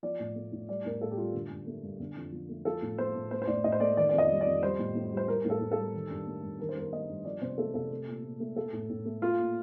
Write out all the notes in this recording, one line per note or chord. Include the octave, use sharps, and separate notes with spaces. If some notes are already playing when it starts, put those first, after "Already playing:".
F3 D5
A2
A3
A2
G3 D5
A2 A#4
A2 A4
G4
G3 F4
D3
G2
A3
G2
D3
F2
F3
A3
F3 A4
A2
A3 C5
A2
A3 C5
C5
A2 D5
A2 D#5
C5
A3 D5
D#3 D5
F2 D5
D#5
G3
D5
F2
G3 C5
A2
A2
G3
C5
G3 A#4
A2 A#4
A4
A2
A4
G3
D#3
G2
A3
G2
D#3 A#4
C5
G2 A#4
A3 D#5
G2
F3 D5
C3 C5
A3 A4
C3 A4
A3
A#2
A#2
A3
A3 A4
A2
A2
A3
A3 F4
A#2